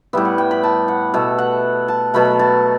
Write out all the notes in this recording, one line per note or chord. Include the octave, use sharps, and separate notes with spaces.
A2 G3 B3 E5
F#5
G5
B5
A5
F#5
B2 A3 E5
F#5
A5
B2 F#3 A3 B5
A5